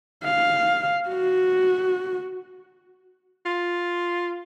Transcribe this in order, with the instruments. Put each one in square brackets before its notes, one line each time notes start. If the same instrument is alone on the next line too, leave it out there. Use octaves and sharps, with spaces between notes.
[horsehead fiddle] F5
F#4
[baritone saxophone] F4